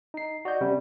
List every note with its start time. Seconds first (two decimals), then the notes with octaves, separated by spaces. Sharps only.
0.14 D#4 C7
0.45 F#4 D5 D#5 G6
0.61 C3 G3 C4 C#4